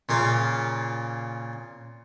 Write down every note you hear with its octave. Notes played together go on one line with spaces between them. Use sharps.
A#2 C#3 A#3 F4